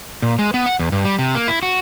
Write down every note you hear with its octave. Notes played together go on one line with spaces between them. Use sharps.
A#2
G#3
B3
F#5
E2
G2
G3
C3
A#3
E4
F#4